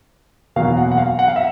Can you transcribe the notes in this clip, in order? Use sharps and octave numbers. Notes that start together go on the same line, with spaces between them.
E2 B2 F#3 A#3 F5
F#5
F#5
F5
F#5
F5
E5